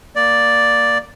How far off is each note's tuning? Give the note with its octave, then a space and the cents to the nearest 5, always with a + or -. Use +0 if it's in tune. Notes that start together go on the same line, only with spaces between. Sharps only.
A#3 +0 D5 +0